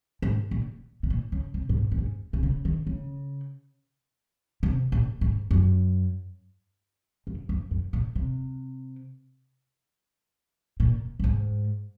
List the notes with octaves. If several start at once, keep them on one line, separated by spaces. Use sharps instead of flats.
G#2
A#2
C3
A#2
C#3
C3
G#2
A#2
F#2
G#2
C3
C#3
D#3
C#3
C3
A#2
G#2
F#2
F#2
F#2
F#2
A#2
C3
A#2
F#2
G#2